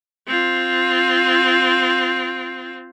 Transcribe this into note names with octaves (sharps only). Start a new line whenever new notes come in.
C4 F4